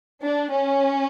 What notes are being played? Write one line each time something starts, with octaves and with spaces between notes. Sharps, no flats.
D4
C#4